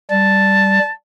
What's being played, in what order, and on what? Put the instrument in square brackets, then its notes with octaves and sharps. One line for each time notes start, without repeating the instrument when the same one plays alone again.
[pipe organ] G3 [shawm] A5